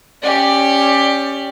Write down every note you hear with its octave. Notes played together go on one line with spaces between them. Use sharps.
C#4 G4 D5